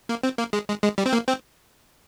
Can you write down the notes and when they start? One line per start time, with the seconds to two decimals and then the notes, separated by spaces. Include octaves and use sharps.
0.09 A#3
0.23 C4
0.38 A#3
0.53 G#3
0.68 G#3
0.83 G#3
0.98 G3
1.06 C4
1.13 A#3
1.28 C4